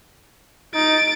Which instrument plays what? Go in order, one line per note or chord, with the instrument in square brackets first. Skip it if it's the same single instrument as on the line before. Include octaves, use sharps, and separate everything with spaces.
[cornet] D#4 [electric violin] A6 D7